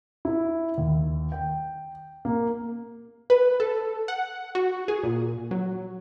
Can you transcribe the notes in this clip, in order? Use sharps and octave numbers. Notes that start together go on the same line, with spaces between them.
E4
D#2
G5
A#3
B4
A4
F#5
F#4
G#4
A#2
F#3